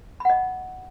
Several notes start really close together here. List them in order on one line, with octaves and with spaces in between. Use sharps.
B5 F#5 D#5